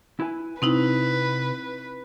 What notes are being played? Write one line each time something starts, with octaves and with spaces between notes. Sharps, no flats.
E4 B4 G#5
C3 C4 D#4 E4 B4